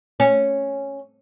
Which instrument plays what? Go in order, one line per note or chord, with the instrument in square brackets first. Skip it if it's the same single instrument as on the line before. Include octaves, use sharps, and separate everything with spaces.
[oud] C#4